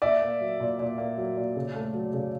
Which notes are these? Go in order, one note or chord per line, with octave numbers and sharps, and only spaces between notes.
A#2 D5 E5
A#3
F#3
A#2
A#2
A#3
F#3
A#2
C#3
A3
F#3
C#3